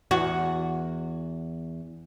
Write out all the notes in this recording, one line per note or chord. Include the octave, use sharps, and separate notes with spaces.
E2 F#4